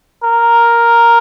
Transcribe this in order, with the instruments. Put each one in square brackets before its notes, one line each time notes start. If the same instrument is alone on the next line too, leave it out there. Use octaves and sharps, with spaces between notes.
[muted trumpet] A#4